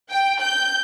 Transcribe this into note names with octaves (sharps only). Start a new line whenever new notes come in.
G5
G6